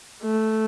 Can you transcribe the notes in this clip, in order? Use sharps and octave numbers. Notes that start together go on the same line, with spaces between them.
A3